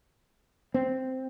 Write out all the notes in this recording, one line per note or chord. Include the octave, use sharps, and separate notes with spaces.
C4